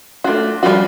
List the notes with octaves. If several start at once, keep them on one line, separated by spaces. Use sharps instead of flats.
A3 D4 F4 F#4
F3 G3 C4 F4 F#4